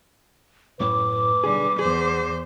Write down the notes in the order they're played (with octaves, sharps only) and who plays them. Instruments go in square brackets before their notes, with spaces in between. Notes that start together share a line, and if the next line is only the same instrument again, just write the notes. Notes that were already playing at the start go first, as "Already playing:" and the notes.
[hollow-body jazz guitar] F#2 A2 [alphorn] B4 [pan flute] D6
[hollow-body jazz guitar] B1 D3 G#4 [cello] G3
[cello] E2 C5 [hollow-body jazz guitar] G#4